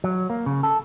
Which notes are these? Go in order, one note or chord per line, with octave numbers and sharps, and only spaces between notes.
F#3
A#3
C#3
A4